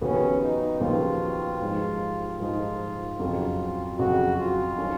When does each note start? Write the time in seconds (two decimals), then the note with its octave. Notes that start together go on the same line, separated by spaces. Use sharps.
0.01 D#2 C#3 F3 B3 C#4 F#4
0.41 D#4
0.80 D#2 C#3 F3 B3 F4 F#4
1.60 G#2 F3 G#3 D#4
2.39 G#2 F3 G#3 D#4 F4
3.19 F2 C#3 F#3
3.98 F2 C#3 F#3 F#4
4.37 F4
4.78 D#3 F#3 C#4